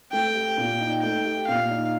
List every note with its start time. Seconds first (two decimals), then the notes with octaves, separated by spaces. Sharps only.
0.12 A3 G5
0.35 G4
0.57 A#2
0.80 D#4
1.02 A3 G5
1.25 G4
1.47 A#2 F5
1.70 D#4